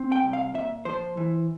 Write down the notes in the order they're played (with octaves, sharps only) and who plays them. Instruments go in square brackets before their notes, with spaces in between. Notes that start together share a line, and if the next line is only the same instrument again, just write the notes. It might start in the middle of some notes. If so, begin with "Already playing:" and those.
Already playing: [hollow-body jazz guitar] C4
G5
C2
F5
A#2 E5
F3 C5
E3